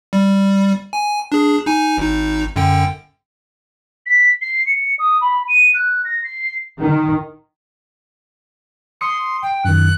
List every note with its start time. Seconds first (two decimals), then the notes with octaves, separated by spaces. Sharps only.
0.13 G3
0.93 G#5
1.32 D4 G#4
1.66 D#4 G#5
1.98 G#1 D#4
2.56 F#2 D3 G5
4.06 B6
4.41 C7
4.66 C#7
4.99 D#6
5.21 B5
5.48 D#7
5.74 F#6
6.05 A#6
6.24 C7
6.80 D#3
9.01 C6 D#6 C#7
9.42 G5
9.65 F#2 D#3 F#6